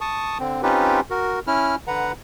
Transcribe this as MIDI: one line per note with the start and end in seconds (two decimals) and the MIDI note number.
0.01 0.38 81
0.01 0.38 85
0.01 0.38 87
0.39 0.62 50
0.39 0.62 60
0.63 1.00 60
0.63 1.00 61
0.63 1.00 63
0.63 1.00 65
0.63 1.00 67
0.63 1.00 71
1.10 1.39 66
1.10 1.39 70
1.47 1.76 61
1.47 1.76 64
1.47 1.76 89
1.87 2.12 50
1.87 2.12 71
1.87 2.12 78
1.87 2.12 82